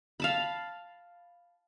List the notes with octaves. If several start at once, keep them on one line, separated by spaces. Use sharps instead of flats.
F5 A5 B5